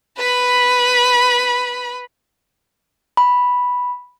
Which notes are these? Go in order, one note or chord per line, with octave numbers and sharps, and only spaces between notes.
B4 B5
B5